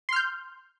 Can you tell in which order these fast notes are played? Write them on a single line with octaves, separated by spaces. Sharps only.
C6 F6 G6